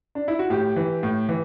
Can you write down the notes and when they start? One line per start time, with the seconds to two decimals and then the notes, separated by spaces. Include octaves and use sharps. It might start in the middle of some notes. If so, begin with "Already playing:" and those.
0.15 D4
0.28 E4
0.39 F#4
0.50 A2 G4
0.76 E3
1.03 A2
1.29 E3